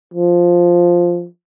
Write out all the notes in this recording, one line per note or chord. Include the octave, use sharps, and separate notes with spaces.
F3